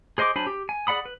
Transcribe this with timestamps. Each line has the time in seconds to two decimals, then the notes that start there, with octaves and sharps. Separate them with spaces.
0.18 G#4 C5 D#5 C6 D6
0.35 F#3 D4 C5 G#5 B5
0.47 G4
0.69 G#5
0.87 G#4 D5 F#5 B5 D#6
1.06 B4